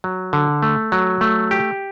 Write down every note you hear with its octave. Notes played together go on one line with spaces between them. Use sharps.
F#3
D3
A3
F#3
A3
G4